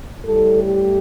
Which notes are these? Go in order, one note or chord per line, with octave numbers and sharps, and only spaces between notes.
A2 G3 A4
G4